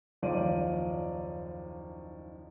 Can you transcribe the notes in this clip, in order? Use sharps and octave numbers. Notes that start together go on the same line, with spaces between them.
F#1 D#2 F3 D#4 D5 D#7